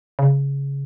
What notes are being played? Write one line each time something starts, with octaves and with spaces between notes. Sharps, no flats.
C#3